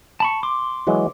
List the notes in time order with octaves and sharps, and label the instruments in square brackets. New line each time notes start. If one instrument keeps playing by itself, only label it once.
[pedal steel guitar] A5 B5 C#6
C6 D6
[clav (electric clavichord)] E3 F#3 G#3